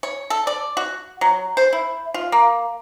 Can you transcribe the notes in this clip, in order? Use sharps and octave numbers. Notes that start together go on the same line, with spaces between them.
C#5
A4
D5
F#4
F#3
C5
E4
F4
A#3